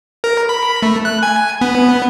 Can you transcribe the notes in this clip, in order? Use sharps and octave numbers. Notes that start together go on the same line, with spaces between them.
A#4
B5
A3
F#6
G#5
B3